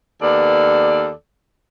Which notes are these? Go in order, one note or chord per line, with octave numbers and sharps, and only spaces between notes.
D#2 B3 A4 D5